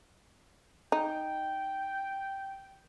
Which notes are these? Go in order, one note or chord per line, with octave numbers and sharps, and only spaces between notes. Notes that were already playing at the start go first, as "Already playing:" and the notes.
D#4 G5